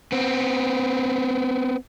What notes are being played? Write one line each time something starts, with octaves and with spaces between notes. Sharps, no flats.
B3 C4